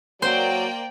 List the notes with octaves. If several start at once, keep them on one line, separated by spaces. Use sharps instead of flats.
F#3 A#3 C5 D5 G5